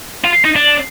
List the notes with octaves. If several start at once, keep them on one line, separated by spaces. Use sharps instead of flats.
F4
D#4
D4